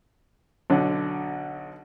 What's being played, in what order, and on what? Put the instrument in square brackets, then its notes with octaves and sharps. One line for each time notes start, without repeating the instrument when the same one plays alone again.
[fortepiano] B1 D3 F#3